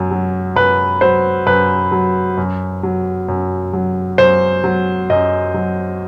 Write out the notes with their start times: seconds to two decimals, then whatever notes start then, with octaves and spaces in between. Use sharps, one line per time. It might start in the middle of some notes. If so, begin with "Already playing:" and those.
Already playing: F#2 F#3
0.11 F#3
0.55 F#2 B4
1.01 F#3 C5
1.46 F#2 B4
1.92 F#3
2.37 F#2
2.83 F#3
3.28 F#2
3.73 F#3
4.18 F#2 C5
4.64 F#3
5.10 F#2 D#5
5.54 F#3